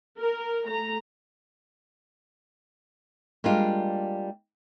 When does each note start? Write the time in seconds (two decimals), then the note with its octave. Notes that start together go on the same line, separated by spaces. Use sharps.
0.18 A#4
0.66 A3 A#5
3.44 G3 G#3 A#3 D4 F4